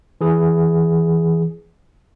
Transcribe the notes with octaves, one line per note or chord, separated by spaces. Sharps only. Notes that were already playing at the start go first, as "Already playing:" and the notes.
E3 G#4